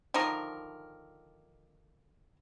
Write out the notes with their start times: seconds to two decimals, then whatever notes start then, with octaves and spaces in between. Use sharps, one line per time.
0.14 D3 D#3 F3 A#4